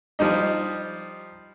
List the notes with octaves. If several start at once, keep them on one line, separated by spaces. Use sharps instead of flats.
F3 G3 D#4 D#5